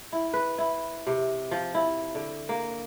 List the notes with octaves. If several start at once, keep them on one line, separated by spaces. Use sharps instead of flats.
E4
B4
E4
C3
F3
E4
D3
A#3